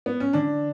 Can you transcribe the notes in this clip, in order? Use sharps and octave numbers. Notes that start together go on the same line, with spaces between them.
B3
C#4
D3 D4